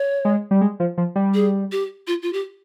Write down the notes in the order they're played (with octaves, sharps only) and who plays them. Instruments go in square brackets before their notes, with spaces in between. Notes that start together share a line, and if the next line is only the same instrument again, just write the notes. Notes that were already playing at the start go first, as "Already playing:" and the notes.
Already playing: [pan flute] C#5
[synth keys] G#3
G3
G#3
F3
F3
G3
[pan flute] G#4
G4
F4
F4
G4